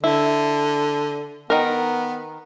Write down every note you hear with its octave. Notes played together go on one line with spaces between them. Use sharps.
D3 E4
D#3 B3 A#4